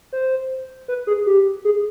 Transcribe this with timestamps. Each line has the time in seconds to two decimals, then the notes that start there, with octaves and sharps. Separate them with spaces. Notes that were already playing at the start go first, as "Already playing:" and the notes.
0.13 C5
0.88 B4
1.07 G#4
1.26 G4
1.65 G#4